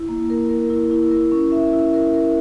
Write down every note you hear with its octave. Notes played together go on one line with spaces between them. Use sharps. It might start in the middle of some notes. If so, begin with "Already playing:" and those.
Already playing: E4
A#3
A#4
A#4
E4
E4
A#4
C#4
E5
E4
A#4
A#4